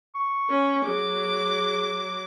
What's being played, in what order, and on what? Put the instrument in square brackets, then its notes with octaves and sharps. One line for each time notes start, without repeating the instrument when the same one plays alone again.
[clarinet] C#6
[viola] C#4
[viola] F#3 D6 [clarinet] G#4